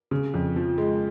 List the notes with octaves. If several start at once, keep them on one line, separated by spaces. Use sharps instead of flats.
C#3
F2
F3
G#3